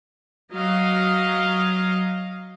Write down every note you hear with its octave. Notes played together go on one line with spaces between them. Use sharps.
F#3 D#5 F5